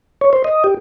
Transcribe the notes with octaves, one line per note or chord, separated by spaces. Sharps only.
C#5
C5
D#5
G4